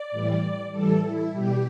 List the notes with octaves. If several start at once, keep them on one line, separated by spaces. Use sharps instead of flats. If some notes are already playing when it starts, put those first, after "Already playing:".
Already playing: D5
A2 E3 G3
A2 E3 G3 A4
E4
B2 G3 G4